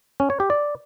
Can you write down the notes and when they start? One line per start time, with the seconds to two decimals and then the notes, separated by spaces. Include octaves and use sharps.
0.20 C#4
0.30 C#5
0.40 G4
0.50 D5